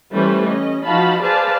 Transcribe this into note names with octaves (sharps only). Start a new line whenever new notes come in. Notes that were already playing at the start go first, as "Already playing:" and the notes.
E3 G3 A3 C#4 B4 C5
C#4 D#5
F3 D#4 F#4 F5 A5 B5
G#4 B4 C5 D5 F5 A5